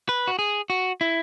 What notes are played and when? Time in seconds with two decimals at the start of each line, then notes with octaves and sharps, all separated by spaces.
0.09 B4
0.28 F#4
0.39 G#4
0.70 F#4
1.01 E4